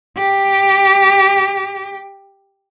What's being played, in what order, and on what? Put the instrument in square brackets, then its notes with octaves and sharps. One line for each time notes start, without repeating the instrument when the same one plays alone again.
[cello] G4